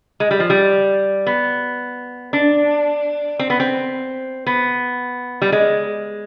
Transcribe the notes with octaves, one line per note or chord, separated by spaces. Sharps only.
G#3
G3
F3
G3
B3
D4
C4
B3
C4
B3
G3
G#3